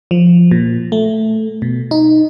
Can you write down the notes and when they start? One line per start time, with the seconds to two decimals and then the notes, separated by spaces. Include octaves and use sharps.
0.11 F3
0.51 A#2
0.92 A3
1.62 B2
1.91 D#4